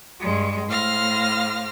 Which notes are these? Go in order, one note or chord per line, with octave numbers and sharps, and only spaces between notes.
G2 G#3
A2 C5 F5 F6 A#6